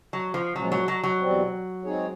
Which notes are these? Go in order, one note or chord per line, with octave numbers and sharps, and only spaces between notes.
F#3
F3
A#2 F3 F#3 G#3 C#4 F4
F#3
F#3
F#3
E2 B2 G3 C4
G#3 C4 D#4 G#4 C#5